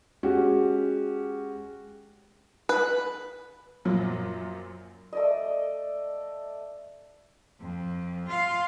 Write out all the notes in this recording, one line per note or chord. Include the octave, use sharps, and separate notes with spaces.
G#3 C#4 F#4 G4
B4
F#2 A#2 F3 F#3
A3 D5 D#5
F2
F4 F5